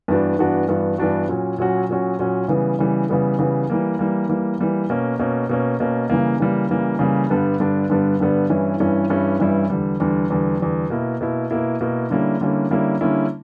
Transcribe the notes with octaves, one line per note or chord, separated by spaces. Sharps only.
G2 E3 B3 D4 F#4
G2 E3 B3 D4 F#4
G2 E3 B3 D4 F#4
G2 E3 B3 D4 F#4
A#2 F#3 C#4 F#4
A#2 F#3 C#4 F#4
A#2 F#3 C#4 F#4
A#2 F#3 C#4 F#4
C#3 E3 G3 B3
C#3 E3 G3 B3
C#3 E3 G3 B3
C#3 E3 G3 B3
E3 G3 A#3
E3 G3 A#3
E3 G3 A#3
E3 G3 A#3
B2 A#3 C#4
B2 A#3 C#4
B2 A#3 C#4
B2 A#3 C#4
C#3 E3 G3 A#3
C#3 E3 G3 A#3
C#3 E3 G3 A#3
C#3 E3 G3 A#3
G2 D3 G3 B3 D4
G2 D3 G3 B3 D4
G2 D3 G3 B3 D4
G2 D3 G3 B3 D4
G2 E3 G3 C#4 E4
G2 E3 G3 C#4 E4
G2 E3 G3 C#4 E4
G2 E3 G3 C#4 E4
E2 D3 G3
E2 D3 G3
E2 D3 G3
E2 D3 G3
B2 A#3 E4
B2 A#3 E4
B2 A#3 E4
B2 A#3 E4
D3 G3 A#3 C#4 E4
D3 G3 A#3 C#4 E4
D3 G3 A#3 C#4 E4
D3 G3 A#3 C#4 E4